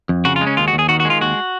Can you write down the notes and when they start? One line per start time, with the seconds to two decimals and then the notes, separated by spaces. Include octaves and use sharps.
0.09 F2
0.25 C#3 F#4
0.36 F4
0.41 G#3
0.47 C#4
0.57 D#2 F4
0.68 F#4
0.73 D#2
0.79 G#4
0.89 D#3 F#4
1.00 F#4
1.05 G#3
1.10 F4
1.21 D#2 F#4